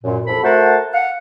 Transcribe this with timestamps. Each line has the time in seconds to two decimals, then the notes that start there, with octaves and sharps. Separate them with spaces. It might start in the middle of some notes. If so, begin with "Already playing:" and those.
0.04 F#2 A#2
0.27 C2 F2 A4 B5
0.44 A3 F#4 A#4 C5 F#5 A5
0.94 F5 F#5